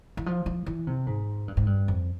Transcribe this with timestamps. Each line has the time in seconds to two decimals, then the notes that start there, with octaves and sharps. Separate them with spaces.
0.17 E3
0.26 F3
0.46 F3
0.66 E3
0.87 C3
1.07 G#2
1.48 G2
1.57 G#2
1.67 G2
1.88 F2